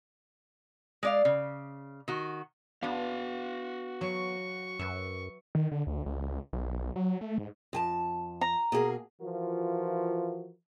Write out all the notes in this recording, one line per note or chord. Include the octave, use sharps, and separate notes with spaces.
G#3 D5 F5
C#3
D#3 F#4
B3 D4 F#4 F5 B5
F#3 B5 C#6
F#2 B4 E5
D#3
D3
D2
C#2
B1
F#3
A3
G#2
F2 G#5 A5
A#5
B2 A#3 G#4
E3 F3 F4 F#4 A#4